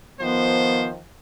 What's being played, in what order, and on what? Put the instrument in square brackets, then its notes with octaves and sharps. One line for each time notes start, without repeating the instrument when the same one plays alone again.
[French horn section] D#3 F3 [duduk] B3 [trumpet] C5